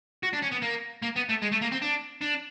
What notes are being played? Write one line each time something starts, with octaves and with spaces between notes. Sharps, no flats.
F#4
D4
C#4
B3
A#3
A#3
B3
A3
G#3
A3
A#3
C4
D4
D4